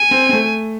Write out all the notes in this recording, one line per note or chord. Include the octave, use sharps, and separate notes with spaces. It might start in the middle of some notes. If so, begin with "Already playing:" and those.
Already playing: G#5
C4
C4
A3